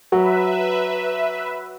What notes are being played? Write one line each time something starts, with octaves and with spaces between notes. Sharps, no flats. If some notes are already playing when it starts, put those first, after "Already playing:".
F#3 B4 E5